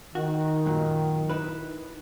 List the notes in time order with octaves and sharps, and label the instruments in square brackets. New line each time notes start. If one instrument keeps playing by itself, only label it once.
[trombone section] D#3 [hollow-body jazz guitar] F#4
[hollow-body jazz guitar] F#2 A#2 F#3
D#4 E4 B4